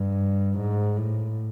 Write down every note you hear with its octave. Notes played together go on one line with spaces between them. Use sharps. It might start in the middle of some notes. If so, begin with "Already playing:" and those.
Already playing: G2
G#2
A2